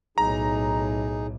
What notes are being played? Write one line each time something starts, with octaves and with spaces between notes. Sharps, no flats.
B1 A2 D#4 G#4 A#5